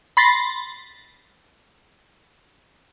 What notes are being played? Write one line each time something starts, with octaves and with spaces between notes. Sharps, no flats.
B5 C6 A6 A#6